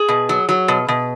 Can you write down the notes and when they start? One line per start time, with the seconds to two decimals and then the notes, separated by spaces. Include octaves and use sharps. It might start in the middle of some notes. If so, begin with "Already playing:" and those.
Already playing: G#4
0.08 B2
0.29 F#3
0.49 F#3
0.68 B2
0.88 B2